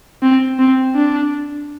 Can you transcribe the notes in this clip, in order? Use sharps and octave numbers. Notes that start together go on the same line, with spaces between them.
C4
C4
D4